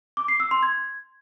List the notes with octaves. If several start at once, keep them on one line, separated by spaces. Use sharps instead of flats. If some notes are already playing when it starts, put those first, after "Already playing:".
D6
C7
E6
C6
G#6